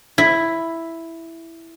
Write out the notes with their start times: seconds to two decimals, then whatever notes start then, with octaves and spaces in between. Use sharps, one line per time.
0.18 E4